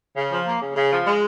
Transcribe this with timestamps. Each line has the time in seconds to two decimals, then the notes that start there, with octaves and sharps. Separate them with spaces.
0.17 C#3
0.31 F3
0.46 A#3
0.61 C#3
0.76 C#3
0.91 F3
1.06 G#3